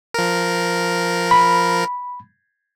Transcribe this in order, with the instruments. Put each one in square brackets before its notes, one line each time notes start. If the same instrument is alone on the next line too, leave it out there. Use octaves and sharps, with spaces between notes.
[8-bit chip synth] F3 A#4
[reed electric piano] B5